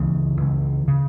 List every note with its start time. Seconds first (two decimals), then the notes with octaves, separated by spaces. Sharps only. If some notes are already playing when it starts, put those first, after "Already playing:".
Already playing: C#2 C#3 E3
0.37 C#2 C#3
0.88 C#3